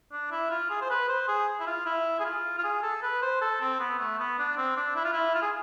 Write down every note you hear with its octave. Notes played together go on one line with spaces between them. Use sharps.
D4
E4
F4
G#4
C5
B4
C5
G#4
E4
F4
E4
G#4
F4
F4
G#4
A4
B4
C5
A4
C4
B3
A3
B3
D4
C4
D4
E4
F4
E4
F4
G#4